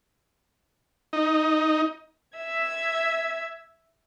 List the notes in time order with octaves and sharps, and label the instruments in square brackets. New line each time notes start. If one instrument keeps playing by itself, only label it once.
[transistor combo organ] D#4
[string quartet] E5 G#6